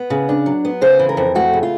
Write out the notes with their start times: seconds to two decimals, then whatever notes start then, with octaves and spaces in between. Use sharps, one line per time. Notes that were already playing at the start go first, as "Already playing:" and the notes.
Already playing: B3
0.10 C#3
0.29 D4
0.46 F#3
0.65 B3
0.81 C#3 C5
0.99 E3
1.09 A#4
1.17 F2
1.35 A3 F#4
1.53 C#3
1.63 F4